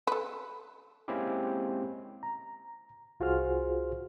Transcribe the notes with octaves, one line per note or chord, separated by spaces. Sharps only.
A4 B4
G#3 A#3 C4 C#4 E4 G4
A#5
C2 F4 F#4 G#4 C5 F6